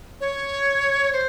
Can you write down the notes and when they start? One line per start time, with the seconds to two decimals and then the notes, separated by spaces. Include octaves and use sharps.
0.21 C#5
1.13 C5